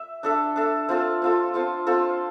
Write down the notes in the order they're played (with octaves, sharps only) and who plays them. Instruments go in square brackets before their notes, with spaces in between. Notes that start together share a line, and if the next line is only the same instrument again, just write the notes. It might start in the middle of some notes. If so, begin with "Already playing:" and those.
Already playing: [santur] E5
D4 A4 E5
D4 A4 E5
C4 F4 A4
C4 F4 A4
C4 F4 A4
C4 F4 A4